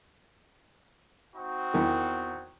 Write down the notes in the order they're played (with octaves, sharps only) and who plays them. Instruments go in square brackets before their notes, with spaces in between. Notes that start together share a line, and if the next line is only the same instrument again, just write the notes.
[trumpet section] C4 D#4 F#4
[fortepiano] E2 D#3